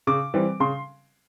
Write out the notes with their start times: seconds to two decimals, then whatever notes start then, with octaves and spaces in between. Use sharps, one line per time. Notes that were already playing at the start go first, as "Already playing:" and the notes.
0.07 C#3 D6
0.34 E3 G3 C4
0.60 C#3 C6